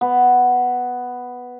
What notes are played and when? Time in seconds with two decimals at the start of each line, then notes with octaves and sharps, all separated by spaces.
0.01 B3